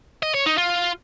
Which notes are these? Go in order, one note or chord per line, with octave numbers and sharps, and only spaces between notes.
D#5
C#5
D#4
F4